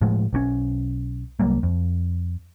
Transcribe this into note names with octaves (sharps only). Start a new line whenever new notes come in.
A2 F3 G#3
B1 D#3 C#4
C2 F#3 G3 A#3
F2